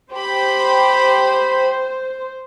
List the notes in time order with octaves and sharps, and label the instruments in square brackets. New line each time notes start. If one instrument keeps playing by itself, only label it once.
[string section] G4 B5 [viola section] C5